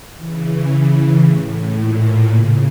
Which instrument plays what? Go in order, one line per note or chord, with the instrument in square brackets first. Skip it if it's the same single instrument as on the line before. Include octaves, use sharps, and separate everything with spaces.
[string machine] C#3 E3
A2
A#2
C#3